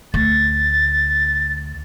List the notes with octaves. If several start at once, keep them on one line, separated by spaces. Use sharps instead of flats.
D2 A6